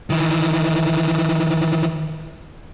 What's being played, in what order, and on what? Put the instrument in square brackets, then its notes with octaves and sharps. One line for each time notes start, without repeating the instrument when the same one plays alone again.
[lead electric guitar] D#3 E3